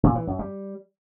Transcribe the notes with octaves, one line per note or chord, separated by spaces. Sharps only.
A#2
E3
F#2
G3